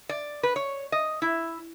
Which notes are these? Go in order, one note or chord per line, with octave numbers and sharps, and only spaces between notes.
D5
B4
C#5
D#5
E4